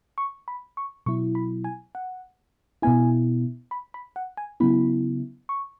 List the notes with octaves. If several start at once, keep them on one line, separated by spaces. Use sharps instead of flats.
C#6
B5
C#6
B2 F#3 E4 C#6
B5
G#5
F#5
B2 B3 E4 G#5
B5
B5
F#5
G#5
C#3 F#3 B3 E4 B5
C#6